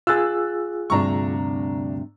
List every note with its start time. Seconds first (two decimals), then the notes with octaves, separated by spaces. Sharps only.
0.07 F4 G#4 E6 F#6 A6
0.90 D2 G2 C3 D4 A#5 C#6